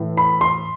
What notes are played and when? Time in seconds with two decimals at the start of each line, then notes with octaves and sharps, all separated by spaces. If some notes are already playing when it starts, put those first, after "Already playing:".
Already playing: A2 E3
0.17 B5
0.41 C6